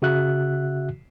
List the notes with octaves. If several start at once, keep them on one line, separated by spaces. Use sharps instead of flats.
C#3 F#4 E5 F#6